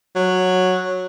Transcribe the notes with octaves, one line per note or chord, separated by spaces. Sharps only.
F#3